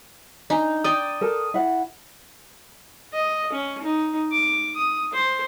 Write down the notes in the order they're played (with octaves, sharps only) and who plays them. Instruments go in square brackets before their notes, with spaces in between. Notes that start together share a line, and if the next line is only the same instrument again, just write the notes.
[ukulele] D4 G#5 A#5 [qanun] D#4
[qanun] D5 G5 [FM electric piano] D#6
[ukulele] A4 A#4 A5
E4 F#5
[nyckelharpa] D#5
C#4
D#4
D6
D#6
C5